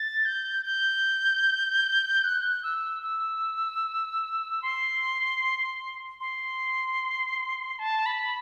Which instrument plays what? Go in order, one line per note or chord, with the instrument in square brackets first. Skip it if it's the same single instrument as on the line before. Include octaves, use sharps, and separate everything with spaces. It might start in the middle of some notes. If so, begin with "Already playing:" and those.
Already playing: [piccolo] A6
G6
G6
F#6
E6
E6
C6
C6
A5
B5